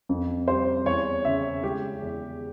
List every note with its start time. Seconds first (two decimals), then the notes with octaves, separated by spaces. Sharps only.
0.09 F2
0.48 G3 C5
0.86 E2 C#5
1.25 C#3 E5
1.63 G#3 G4
2.02 E2